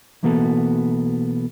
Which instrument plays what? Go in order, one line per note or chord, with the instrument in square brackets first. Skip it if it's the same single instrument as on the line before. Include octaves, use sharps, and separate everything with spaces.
[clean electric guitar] B1 E3 A#3 B3 F#4 A4